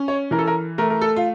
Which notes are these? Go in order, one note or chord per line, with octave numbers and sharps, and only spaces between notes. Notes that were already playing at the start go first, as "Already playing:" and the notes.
Already playing: C#4
C#5
E3 A#4
A4
A#4
A3 A#4
A#4
A4
F4